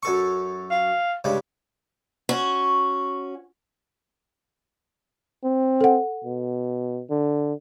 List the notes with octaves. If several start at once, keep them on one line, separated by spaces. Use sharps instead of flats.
F#2 A4 C#6
F5
G2 C#3 G#3
C#4 F#4
C4
A4 F#5
B2
D3